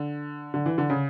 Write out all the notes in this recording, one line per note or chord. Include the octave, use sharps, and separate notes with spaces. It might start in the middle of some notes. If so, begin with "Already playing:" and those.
Already playing: D3
D3
E3
D3
C#3